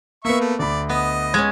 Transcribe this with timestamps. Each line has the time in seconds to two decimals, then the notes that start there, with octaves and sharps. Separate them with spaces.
0.25 A#3 B3 E5 C#6
0.41 A3
0.59 D2 D5 B5
0.89 B3 D#5
1.34 G#3 C#4 G#6